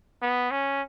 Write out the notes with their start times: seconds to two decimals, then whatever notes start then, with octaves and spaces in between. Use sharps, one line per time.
0.22 B3
0.51 C#4